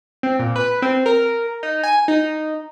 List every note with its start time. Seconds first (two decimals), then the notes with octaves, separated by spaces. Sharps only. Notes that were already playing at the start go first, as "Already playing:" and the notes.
0.23 C4
0.39 A#2
0.56 B4
0.82 C4
1.06 A#4
1.63 D#4
1.83 G#5
2.08 D#4